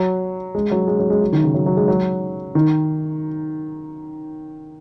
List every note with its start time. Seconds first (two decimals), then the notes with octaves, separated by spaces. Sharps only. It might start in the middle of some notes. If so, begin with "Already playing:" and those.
Already playing: F#3
0.55 G#3
0.71 F#3
0.88 G#3
0.99 F#3
1.10 G#3
1.21 F#3
1.33 D#3
1.44 C#3
1.54 F#3
1.66 F#3
1.77 G#3
1.88 F#3
2.55 D#3